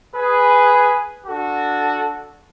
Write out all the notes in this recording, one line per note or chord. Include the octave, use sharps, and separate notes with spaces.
G#4 B4
D4 F#4 A4